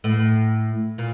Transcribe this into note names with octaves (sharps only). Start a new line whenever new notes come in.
A2
A#2